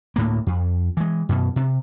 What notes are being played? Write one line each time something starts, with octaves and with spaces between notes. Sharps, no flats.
D2 A2 A#3
F2
E3 G#3
F#2 B2
C3